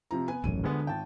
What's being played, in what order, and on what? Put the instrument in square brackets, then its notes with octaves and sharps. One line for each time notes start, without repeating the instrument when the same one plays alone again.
[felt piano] C3 F3 A#5
B3 B4 G#5
[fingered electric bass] D#1 A1 F#2 [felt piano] D#7
[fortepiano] D2 G#3 B3 [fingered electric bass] D3
[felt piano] G#1 [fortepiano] G5 A5